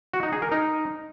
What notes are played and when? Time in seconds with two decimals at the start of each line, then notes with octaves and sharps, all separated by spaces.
0.14 F#4
0.23 D#4
0.33 G#4
0.42 A#4
0.52 D#4